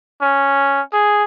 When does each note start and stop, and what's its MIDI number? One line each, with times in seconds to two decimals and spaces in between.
0.21 0.81 61
0.93 1.24 68